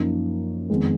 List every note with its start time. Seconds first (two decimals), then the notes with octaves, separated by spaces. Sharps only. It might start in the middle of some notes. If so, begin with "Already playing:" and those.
Already playing: F#2 F3 A#3 D#4
0.70 F2 D#3 G#3 B3